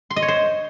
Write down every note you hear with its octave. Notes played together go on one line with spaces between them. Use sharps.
C6
D#5
C#5
C5